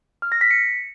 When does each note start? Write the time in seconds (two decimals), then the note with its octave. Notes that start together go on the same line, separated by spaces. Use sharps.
0.22 F6
0.32 A#6
0.41 B6
0.51 C#7